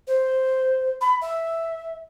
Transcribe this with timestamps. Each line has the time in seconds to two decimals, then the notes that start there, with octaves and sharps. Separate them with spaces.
0.07 C5
1.01 B5
1.21 E5